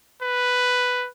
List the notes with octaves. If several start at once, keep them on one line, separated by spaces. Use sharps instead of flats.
B4